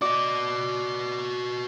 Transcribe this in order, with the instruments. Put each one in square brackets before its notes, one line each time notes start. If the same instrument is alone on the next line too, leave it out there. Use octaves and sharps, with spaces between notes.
[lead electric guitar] F#4 D#5 [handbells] D5 D6